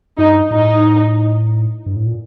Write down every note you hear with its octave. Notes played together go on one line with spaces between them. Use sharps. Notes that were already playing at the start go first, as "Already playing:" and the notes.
G2 D#4
A2 D#4
G2
A2
A#2